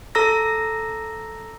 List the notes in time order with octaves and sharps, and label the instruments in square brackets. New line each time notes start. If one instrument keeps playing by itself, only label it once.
[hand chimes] A4 A#5 E6 A#6